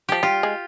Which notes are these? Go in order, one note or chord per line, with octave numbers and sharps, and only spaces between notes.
F3 G4
G3 F4
G#3